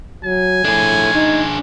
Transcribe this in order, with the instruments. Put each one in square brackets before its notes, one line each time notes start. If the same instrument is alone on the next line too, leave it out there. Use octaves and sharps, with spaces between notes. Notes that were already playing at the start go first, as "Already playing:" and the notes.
[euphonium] F#3 [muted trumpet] G#5
[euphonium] A2 [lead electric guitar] D4 G#4
[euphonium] D#4